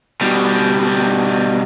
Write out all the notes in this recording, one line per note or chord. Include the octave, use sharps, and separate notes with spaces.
B2 G3